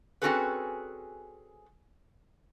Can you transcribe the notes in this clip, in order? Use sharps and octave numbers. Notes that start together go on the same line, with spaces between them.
C4 C#4 F#4 G#4 A4 B4